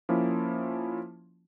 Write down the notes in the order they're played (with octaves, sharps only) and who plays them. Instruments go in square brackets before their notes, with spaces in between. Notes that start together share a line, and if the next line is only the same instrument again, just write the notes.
[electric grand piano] F3 A#3 C#4 E4